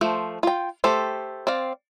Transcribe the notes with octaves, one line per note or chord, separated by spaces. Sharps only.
F3 A3 C5
F4 G5
A3 G4 A4 C5
C4 D5 F5